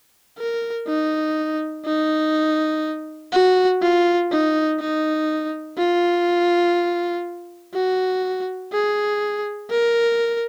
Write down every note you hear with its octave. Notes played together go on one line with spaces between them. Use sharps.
A#4
D#4
D#4
F#4
F4
D#4
D#4
F4
F#4
G#4
A#4